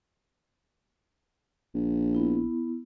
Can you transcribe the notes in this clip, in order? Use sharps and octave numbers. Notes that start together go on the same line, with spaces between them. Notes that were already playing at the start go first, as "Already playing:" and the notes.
A#1
B3 E4